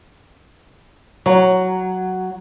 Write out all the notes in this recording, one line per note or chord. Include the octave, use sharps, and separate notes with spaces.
F#3 C#5